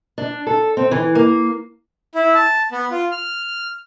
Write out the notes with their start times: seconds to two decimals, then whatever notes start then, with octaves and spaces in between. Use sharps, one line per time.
0.18 D4
0.47 A4
0.77 C4
0.91 E3
1.15 A#3
2.15 E4
2.35 A5
2.72 B3
2.91 F4
3.12 F6